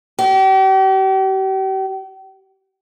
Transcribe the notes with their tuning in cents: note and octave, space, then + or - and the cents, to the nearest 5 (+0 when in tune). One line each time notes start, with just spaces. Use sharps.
G4 -40